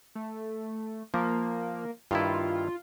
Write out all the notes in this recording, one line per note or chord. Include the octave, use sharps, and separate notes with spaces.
A3
F3 A#3
G2 D#3 E4 F4